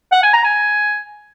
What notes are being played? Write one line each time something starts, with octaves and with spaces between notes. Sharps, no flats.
F#5
G#5
A#5
G#5